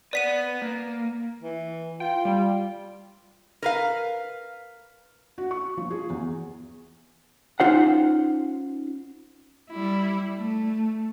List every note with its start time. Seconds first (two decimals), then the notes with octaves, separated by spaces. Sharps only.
0.13 B4 D5 F#5 B6 D#7
0.62 A#3
1.42 E3
2.00 F4 G5
2.25 G3
3.62 A#4 B4 F5
5.38 F#4
5.51 C#6
5.77 F3
5.90 G#4
6.10 E2
7.60 C#4 D#4 F4 C5 F#5
9.70 G3 E4
10.36 A3